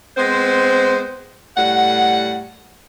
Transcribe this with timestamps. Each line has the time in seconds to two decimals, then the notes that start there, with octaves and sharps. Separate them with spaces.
0.17 G#3 B3 C4 C5
1.56 A2 G3 F#5